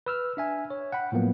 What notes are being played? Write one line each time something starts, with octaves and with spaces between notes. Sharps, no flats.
B4 E6 F6
D4 E5 G#5
C#5
F#5 G5 B5
A2 F3 F#3 A#3 B3